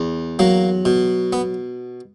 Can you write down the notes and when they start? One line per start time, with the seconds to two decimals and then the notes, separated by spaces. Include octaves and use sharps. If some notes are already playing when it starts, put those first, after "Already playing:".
Already playing: E2
0.39 F#3 A#3
0.85 B2
1.33 B3